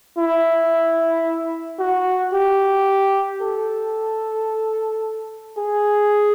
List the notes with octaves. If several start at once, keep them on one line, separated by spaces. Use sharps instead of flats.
E4
F#4
G4
A4
G#4